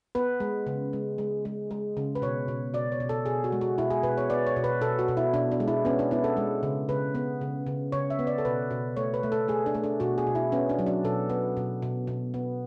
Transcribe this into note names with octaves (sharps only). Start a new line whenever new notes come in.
B3 B4
G#3
C#3
G#3
G#3
G#3
G#3
C#3
B4
B2 C#5
B2
B2 D5
C#5
B2
A4
B2 G#4
F#4
G#3
F#4
B2 E4
G#4
B2 B4
C#5
B3 D5
C#5
B2
B4
B2 A4
F#4
B2
E4
B2 D4
D4
G#3
E4
B3 C#4
D4
B3 E4
A4
G#3
C#3
C#3 B4
B3
C#3
C#3
C#3 C#5
E5
B3
D5
A4
B2 B4
B2
A3 C#5
B4
A3
A4
A3 G#4
D4
A3
D4
B2 F#4
G#4
B2
E4
B3 C#4
D4
F#3
D4
B2 A4
B3
B2
B2
B2
B3